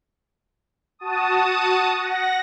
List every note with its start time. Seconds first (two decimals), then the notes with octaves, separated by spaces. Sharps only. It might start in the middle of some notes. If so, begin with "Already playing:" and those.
0.99 F#4 A5 D#6
1.97 F#5 A#6